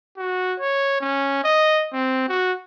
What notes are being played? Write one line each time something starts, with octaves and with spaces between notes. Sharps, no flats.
F#4
C#5
C#4
D#5
C4
F#4